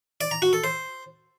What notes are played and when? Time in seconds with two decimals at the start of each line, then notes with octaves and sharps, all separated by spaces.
0.21 D5
0.31 A#5
0.42 F#4
0.53 A4
0.64 C5